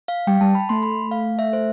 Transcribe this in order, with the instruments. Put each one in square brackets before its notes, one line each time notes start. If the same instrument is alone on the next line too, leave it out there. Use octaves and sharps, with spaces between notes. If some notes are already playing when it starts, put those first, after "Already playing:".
[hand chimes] F5
[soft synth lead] G3 [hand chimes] G5
[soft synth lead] G3 [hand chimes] A5
[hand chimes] B5
[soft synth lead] A3 [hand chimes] C6
[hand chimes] B5
F5
E5
C5